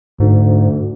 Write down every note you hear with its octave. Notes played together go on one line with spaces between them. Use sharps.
D2 G#2